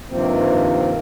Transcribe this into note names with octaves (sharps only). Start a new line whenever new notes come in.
G2 C3 D#3 F3 A#3 C4